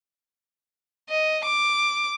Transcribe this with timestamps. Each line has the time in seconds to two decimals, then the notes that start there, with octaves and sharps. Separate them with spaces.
1.09 D#5
1.45 D6